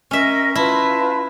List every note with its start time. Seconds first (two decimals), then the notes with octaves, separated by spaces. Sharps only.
0.11 C#4 A#4 D#5 E5
0.55 E4 F4 B4 A5